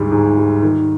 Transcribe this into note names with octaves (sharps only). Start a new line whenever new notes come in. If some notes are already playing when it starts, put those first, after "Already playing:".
Already playing: D2 G#2 G3
G#2
G3
D#3